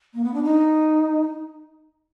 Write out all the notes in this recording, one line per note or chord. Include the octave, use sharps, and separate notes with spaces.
A#3
B3
D4
D#4